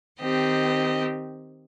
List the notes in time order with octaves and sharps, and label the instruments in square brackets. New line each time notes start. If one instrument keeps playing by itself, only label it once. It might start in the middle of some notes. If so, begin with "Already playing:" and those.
[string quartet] D#3 C4 G4 D#5